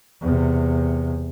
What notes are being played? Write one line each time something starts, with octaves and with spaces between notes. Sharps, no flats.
E2 C3